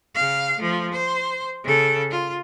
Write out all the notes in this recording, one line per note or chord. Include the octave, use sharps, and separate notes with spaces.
C#3 F5
F3 A3
C5
C#3 A4
F4